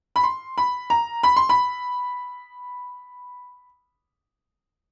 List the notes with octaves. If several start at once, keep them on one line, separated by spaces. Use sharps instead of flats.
B5
C6
B5
A#5
B5
C6
B5